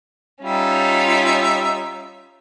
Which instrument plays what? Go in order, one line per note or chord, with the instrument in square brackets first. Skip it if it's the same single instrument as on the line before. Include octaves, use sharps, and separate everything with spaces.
[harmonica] G3 D#4 E5 [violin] C#4 F4